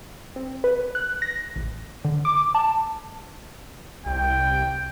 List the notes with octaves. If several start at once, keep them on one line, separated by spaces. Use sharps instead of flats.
C4
B4
F#6
A#6
A1
D3
D6
A5
C2 G5